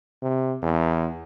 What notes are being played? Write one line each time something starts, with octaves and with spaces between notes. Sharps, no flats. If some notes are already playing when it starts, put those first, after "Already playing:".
C3
E2